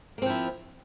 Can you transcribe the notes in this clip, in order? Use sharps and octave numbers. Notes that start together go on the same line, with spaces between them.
F3 A#3 C4 E4